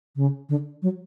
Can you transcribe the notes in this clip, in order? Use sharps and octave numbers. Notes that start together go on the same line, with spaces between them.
C#3
D3
F#3